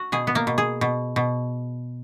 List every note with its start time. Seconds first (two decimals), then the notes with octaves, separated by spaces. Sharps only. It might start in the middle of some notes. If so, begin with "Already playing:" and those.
Already playing: F#4
0.12 B2 G#4
0.27 B3
0.35 A#3
0.47 B2
0.58 G#4
0.81 B2
1.16 B2